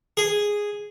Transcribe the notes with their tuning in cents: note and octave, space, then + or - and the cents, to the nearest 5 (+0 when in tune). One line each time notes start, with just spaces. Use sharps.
G#4 -5